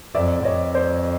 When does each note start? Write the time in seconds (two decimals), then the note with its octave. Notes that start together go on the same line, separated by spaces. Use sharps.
0.15 F2 D5 E5
0.44 F2 C#5 D#5
0.74 C5 D5